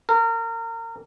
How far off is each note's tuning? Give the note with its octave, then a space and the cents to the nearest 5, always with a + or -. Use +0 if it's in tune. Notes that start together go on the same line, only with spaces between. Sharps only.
A#4 -30